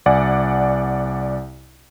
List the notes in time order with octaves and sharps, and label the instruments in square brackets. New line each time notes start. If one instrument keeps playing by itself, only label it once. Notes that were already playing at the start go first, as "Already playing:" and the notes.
[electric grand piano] C2 D5 F#5 G#5